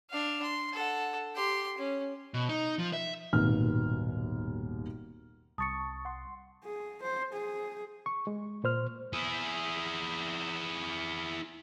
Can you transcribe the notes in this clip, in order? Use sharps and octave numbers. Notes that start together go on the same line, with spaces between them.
D4 F5
C6
A4 F#5
G4 C6
C#4
B2
D#4
F3
E5
D#1 G#1 D#2 B2 B3 F6
C2 A5 C#6 D#6 A6 C#7
F#5 C6
G#4
C5
G#4
C#6
G#3
A#2 C5 F6
E4 G#4